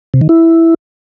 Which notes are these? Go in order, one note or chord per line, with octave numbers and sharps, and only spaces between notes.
C3
D#3
E4